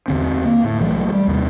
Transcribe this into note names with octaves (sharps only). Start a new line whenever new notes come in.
E2 D3 C4
A#3
A2
B1 E3 F#3 A3
F#3 G3
D#2 C3